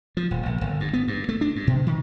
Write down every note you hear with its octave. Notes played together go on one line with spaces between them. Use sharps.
F3
D#1
A#1
G1
G2
B3
G2
A3
D4
G2
B2
D#3